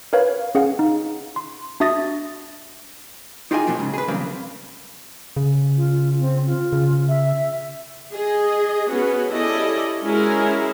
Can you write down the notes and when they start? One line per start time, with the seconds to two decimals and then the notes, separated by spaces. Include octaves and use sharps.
0.13 A#4 B4 C#5 F5
0.55 C#4 G#4 F5 F#5
0.79 D#4
1.36 C6
1.80 D4 F#4 E5 D#6 A6 A#6
3.51 D#4 F4 G4 G#4 D#5 G#5
3.67 B2 F3 F#3 A#3 C4
3.79 G#2 C#3
3.94 G#4 B4
4.08 E2 G2 C#3 F#3 A#3 C4
5.36 C#3
5.77 F4
6.20 C4
6.46 F4
6.73 C#3
7.09 E5
8.14 G#4 D#5
8.90 B3 C#4 F#4 G#4
9.32 C#4 E4 G4 A4 D5 D#5
10.03 G#3 C#4 E4 F#4 G#4 A#4